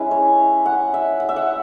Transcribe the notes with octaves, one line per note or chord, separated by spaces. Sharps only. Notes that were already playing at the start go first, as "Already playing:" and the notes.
Already playing: G#3 C#4 E4 B4
C#5
F#5
E5
F#5
E5
F#5